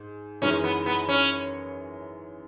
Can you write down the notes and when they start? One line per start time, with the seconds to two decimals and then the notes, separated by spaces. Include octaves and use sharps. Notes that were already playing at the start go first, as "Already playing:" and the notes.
Already playing: G#2
0.42 F#2 E3 G#3 C#4 D#4
0.64 B3
0.86 B3
1.09 C#4